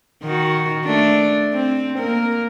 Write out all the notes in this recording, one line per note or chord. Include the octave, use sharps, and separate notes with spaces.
D#3 F#4
A3 D4
C4
A#3 A#4